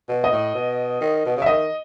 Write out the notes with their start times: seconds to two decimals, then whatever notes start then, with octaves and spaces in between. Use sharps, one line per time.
0.09 B2
0.24 D#5
0.32 A2
0.55 B2
1.01 D#3
1.26 B2
1.37 C#3 E5
1.46 D#3 D#5